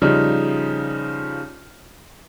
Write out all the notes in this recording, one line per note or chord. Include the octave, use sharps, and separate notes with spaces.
C#3 F3 G3 D#4